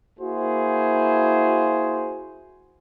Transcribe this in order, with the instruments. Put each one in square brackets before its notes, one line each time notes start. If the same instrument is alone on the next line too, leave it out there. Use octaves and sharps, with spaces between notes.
[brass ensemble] A#3 E4 F#4 G#4 C5